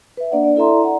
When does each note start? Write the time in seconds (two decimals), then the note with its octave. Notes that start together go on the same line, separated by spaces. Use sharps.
0.17 B4 E5
0.31 A#3 D4 D5 F#5
0.44 D5
0.56 E4 A4 D5 E5 A#5 C6
0.84 D5 F#5 A#5